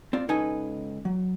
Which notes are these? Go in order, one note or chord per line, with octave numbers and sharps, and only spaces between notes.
C4 F4 D5
C#2 C#4 D#4 A4 B4 G#5
F#3